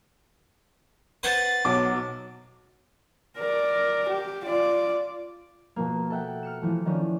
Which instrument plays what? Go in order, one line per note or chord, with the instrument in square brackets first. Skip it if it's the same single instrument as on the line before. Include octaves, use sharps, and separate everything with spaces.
[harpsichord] B4 C5 F#5 [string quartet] A6
[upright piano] B1 D6 [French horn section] F#3
[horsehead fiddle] A#4 D5
G4
F4 D5
[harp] B2 F3 A#3
A4 E5 F#5 G5
F6 C#7 E7
E3 F3 A3
D#3 F3 C#4 D4